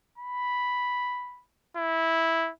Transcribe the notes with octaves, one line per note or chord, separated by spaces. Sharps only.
B5
E4